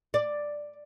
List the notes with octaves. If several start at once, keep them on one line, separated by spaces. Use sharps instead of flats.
D5